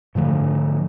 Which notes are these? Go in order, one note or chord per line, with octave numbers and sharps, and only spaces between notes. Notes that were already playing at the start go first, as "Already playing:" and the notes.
G#2 D3 F3 A3